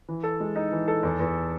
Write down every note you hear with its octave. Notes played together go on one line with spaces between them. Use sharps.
E3
A4
G#3
D#4
E3
A4
E2
E2